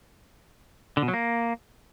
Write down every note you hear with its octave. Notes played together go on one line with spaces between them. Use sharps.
D3
B2
F#3
A#3